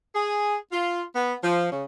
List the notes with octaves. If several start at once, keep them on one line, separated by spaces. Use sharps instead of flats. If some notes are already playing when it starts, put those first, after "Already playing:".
G#4
F4
B3
F3
C#3